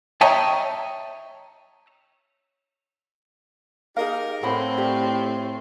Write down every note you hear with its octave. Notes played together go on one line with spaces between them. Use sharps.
C#5 D#5 E5 G5 A5 A#5
D#4 G4 G#4 A#4 D#5 F5
A2 C4 A4 F#5 B5
F4 G4 D5